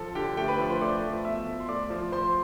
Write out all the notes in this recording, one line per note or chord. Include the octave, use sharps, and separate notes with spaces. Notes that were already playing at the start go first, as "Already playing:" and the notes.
Already playing: F3 A4
D3 G4 G5
A3 G4 G5
B4 B5
F3
C5 C6
A3 D5 D6
F3
B2 E5 E6
A3
C6
A3 D5 D6
F3
F3 C5 C6